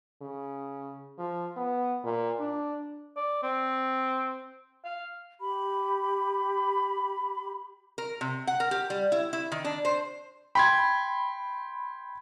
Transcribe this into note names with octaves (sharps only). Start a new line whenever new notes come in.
C#3
F3
B3
A#2
D4
D5
C4
F5
G4 B5
A#4
C3
F#5
A#4
G4
G3
E4
E4
D#3
D4
C5
G5 B5 C6 G#6